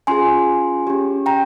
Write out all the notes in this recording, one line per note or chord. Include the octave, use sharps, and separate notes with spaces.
C#4 F4 G#4 G#5 C6
C#4 G4
G5 A#5